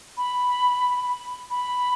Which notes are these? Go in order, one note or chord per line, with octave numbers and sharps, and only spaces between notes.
B5
B5